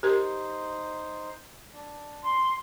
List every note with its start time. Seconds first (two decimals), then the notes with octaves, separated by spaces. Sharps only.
0.03 D#4 G4 A#4 C5
1.74 D4
2.23 C6